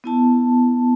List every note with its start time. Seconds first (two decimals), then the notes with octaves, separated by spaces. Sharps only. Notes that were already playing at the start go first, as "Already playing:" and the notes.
0.04 B3 E4 A5